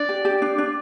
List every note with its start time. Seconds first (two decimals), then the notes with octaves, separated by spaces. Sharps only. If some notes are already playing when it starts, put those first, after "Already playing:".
Already playing: D4 D5
0.09 G4
0.25 G4
0.42 D4
0.58 D4